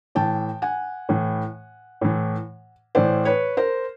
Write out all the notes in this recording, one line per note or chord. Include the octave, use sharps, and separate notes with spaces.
A2 E3 G5 A5
F#5 G#5
A2 E3
A2 E3
A2 E3 C5 D5
B4 C#5
A#4 C5